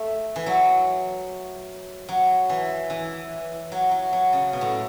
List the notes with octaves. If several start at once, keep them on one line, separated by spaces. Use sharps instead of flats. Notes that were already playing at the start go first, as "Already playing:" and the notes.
Already playing: A3
E3
F#3
F#3
E3
E3
F#3
F#3
F#3
C#3
B2
A2